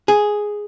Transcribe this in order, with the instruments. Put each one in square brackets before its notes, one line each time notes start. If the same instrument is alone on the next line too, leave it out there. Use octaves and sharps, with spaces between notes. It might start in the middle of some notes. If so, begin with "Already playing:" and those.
[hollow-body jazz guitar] G#4